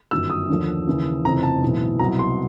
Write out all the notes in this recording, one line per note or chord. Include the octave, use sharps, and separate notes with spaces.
G1 F#2 D#3 F#3 E6
D#6
D#2 D3 F3
D#2 C#3 E3
F1 F2 C#3 E3 A#5
A5
B1 A2 E3
C2 B2 F#3 A#5
C6